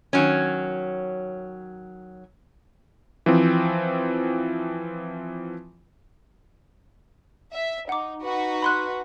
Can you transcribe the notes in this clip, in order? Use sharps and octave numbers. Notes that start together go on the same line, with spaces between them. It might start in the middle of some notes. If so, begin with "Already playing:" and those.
D#3 F#3 C#4
E3 F3 C4
E5
D#4 F#5 D6
D#4 F#4 B4
B5 C6 F#6